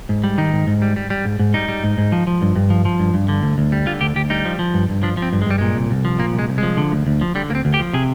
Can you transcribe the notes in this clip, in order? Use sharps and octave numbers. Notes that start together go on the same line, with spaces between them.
G#2
G3
D#3 D#4
G#2
G#2
G3
G3
G3
G#2
G#2
G3 D#4
G3
G#2
G#2
F3
F3
G2
G2
F3
F3
G2
G2
D3
D2
D2
G3
D3 F4
D2 G4
D2 G4
G3 D#4
F3
F3
G2
G2
F3 D4
F3
C4
G2
G#3
G2 G3
A#2 G#3
C2
C2
F3
A#2 A#3
C2
G#3
C2
F3 G#3
D3
D2
D2
F3
D3 G3
D2 A#3
C4
D2
G4
F3
C3 G#4